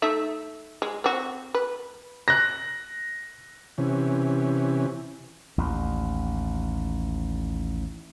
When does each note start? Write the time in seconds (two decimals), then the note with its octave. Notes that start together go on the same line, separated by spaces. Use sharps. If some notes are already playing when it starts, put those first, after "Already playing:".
0.02 A3 D#4 E5
0.82 G#3
1.04 C4 F#4
1.54 B4
2.28 F#6 A#6
3.78 C3 E3 C#4
5.58 A1 D#2